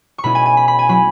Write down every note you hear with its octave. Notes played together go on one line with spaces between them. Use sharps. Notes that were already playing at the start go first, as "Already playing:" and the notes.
C#6
B2 G#3 C#4 E4 B5
G#5
G#5
B5
B5
G#5
F#3 C#4 E4 B5